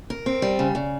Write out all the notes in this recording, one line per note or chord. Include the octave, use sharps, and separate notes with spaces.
A#4
C4
G3
C#3
C#3